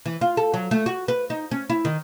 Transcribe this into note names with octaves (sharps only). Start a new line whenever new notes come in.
E3
F4
A4
F#3
A3
F#4
B4
D#4
C#4
E4
D#3